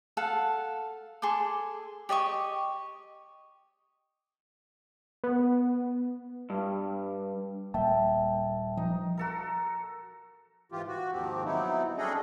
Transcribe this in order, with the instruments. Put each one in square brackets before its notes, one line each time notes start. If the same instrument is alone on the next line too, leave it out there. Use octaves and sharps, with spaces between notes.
[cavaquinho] A4 F5 F#5
G#4 A4 C6 D6
G4 D5 D#5 C#6
[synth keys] B3
[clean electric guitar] G2
[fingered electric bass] D#1 G3 A#3 [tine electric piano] E5 A5 [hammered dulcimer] G5
[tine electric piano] F3 [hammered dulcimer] D#4
[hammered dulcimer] F#4 A4 A#4
[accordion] G#2 E3 F4 G4
F#4
D#2 G#2 D#3 F3 C4 G4
F#3 B3 C4 D#4 E4
G3 C#4 D4 G#4 A4 D#5